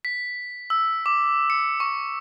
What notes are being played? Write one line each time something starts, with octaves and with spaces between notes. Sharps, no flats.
B6
E6
D6
C#7
C#6